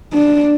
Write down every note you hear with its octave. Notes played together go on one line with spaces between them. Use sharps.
D4